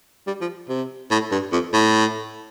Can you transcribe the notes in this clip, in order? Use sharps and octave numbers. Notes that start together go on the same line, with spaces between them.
G3
F3
C3
A2
G2
F2
A2